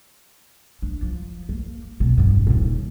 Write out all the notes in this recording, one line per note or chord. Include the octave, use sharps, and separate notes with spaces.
D4
F3
A#3
B2
F1 G2
D#1 D#2